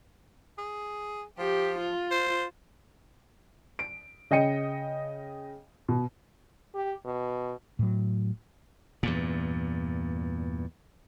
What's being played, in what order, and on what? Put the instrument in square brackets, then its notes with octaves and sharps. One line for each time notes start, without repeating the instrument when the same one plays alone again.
[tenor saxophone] G#4
[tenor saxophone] F3 [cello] G4
[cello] F4
[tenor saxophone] C5
[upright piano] D7
C#3 D#5 G5 C#7 D#7
B2
[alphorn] G4
B2
[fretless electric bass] A2 F#3
[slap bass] E2 G2 A#2